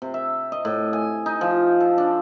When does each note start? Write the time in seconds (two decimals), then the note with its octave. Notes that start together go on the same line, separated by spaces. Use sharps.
0.02 C3
0.14 E5
0.52 D#5
0.65 A2
0.93 G#5
1.26 D#4
1.41 F3
1.80 A4
1.98 D4